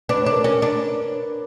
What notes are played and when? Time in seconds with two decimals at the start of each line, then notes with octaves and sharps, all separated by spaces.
0.09 D4 B4
0.21 C#5
0.26 D4
0.32 A#4
0.44 C#4 A#4
0.62 D4